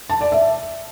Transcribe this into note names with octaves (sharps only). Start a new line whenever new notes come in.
A5
D5
E5